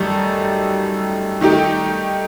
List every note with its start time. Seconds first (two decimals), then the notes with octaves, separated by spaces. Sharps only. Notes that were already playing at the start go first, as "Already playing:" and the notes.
Already playing: F#2 D#3 G3 A3 D#4 A4
1.41 D#3 A3 D#4 G4